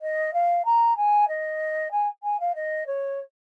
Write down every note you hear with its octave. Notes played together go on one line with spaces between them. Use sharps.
D#5
F5
A#5
G#5
D#5
G#5
G#5
F5
D#5
C#5